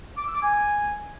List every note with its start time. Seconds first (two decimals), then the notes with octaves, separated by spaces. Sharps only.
0.17 D6
0.26 E6
0.34 D6
0.43 G#5